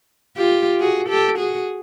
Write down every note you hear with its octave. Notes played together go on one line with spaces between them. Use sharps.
F4 G4
F#4 G#4
G4 A4
F#4 G#4